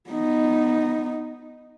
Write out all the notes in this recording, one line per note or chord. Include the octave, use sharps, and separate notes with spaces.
B3 D#4